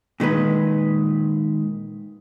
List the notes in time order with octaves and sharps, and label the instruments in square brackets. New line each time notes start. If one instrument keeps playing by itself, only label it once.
[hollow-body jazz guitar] A#2 D#3 G#3 B4